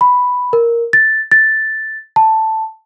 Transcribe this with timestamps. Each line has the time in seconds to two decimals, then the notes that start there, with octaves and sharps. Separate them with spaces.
0.01 B5
0.53 A#4
0.93 A6
1.31 A6
2.16 A5